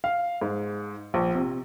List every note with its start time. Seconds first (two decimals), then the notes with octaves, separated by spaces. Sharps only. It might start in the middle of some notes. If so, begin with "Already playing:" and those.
0.04 F5
0.41 G#2
1.14 A#1
1.35 C3